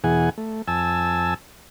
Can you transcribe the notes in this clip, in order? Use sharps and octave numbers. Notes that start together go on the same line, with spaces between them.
E2 B2 E3 G#4 F#5 G#5
A3
F2 G#5 A5 E6